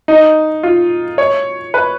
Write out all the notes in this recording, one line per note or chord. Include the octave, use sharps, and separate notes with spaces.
D#4
F4
C#5
B4